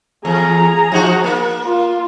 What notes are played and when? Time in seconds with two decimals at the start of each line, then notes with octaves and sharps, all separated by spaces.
0.25 E2 G#4 A#5
0.92 F3 D#4 F#4
1.24 A#3
1.64 F4